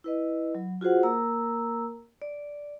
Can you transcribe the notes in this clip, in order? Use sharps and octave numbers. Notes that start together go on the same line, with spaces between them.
E4 B4 D#5
F#3
F4 F#4 G#4 C5 F#5
A#3 A#4 A#5 E6
D5